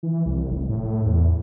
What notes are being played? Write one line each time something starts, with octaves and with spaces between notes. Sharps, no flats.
E3
C2
F1
A2
E2